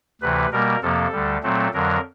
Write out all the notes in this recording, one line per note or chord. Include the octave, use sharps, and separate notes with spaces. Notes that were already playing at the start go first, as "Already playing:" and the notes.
D2 C3 E3 B4
B2 G3 A#3 A#4
F2 C3 F3 A#3 A4
D2 D3 G3
A#2 F#3 A3 C4 A4
F2 D3 F#3 A#4